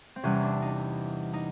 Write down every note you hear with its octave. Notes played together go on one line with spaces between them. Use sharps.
C4
E2 C3 E3 G3 C#4
D4
D#4
D#4